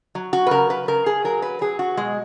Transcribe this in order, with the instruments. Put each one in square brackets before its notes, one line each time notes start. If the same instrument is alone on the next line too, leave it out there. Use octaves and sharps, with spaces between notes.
[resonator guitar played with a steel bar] F#3
F#4
B4
C#3 A#4
B4
C#3 A#4
G#4
F#3 A#4
B4
F#3 G#4
F#4
B2 G#3